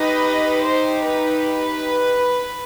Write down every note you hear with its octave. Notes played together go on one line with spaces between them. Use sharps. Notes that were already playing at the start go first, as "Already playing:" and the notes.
Already playing: D#4 G4 B4 D#5
C5
B4